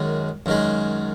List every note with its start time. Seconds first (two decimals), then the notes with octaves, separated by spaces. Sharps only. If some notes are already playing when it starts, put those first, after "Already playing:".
Already playing: F#2 D#3 G#3
0.46 F#2 D#3 G#3